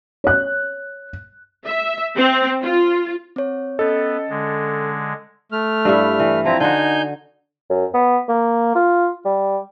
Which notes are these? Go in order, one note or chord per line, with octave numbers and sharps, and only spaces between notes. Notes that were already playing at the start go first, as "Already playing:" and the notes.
C#5 F#6
E5
C4
F4
C4 C#5
B3 C#4 A4 D#5
D3 G#3
A3 F6
G2 G3 E4
E3
F3 C4 E4 A#5
D3 D#4 F#4 G#5 G6
F#2
B3
A#3
F4
G3